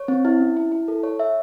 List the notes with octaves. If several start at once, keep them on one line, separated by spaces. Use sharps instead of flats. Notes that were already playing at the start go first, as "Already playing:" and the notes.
Already playing: C#5
C4
E4
C#4
E4
E4
A4
C#5
E5